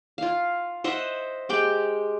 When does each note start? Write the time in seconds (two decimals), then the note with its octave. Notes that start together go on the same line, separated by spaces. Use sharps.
0.18 F4 F5
0.84 C5 D#5 E5 F#5
1.49 G#3 G4 G5